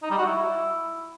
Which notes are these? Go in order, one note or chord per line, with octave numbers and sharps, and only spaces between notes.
D#4
G3
F#4
E4